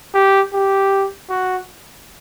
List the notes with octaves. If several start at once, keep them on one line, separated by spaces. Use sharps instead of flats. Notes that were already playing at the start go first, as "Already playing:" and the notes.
G4
G4
F#4